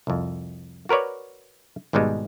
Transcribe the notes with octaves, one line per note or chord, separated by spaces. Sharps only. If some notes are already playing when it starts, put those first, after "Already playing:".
C2 F2
F#4 A#4 B4 C#5 D5
G#1 G#2 B2 G3 G#3